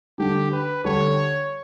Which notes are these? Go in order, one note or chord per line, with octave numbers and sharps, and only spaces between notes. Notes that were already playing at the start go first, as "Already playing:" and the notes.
D3 G3 D4 G4
B4
D3 G3 D4 C#5